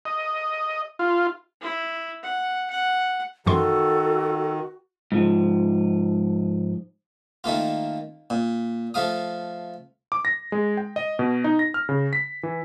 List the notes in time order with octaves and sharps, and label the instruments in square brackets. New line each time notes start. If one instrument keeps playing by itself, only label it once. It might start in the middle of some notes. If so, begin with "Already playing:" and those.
[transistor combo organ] D#5
F4
[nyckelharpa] E4
F#5
F#5
[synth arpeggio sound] F#2 E3 C6 [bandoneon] D#3 [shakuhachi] F#4 [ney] A4
[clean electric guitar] G#2 F3
[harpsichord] D#3 A3 A#3 F4
A#2
F3 A3 F5 D#6
[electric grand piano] D6
A#6
G#3
G5
D#5
B2
D#4
A#6
F6
C#3
B6
E3